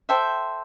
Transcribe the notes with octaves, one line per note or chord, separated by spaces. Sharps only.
A4 C5 E5 G5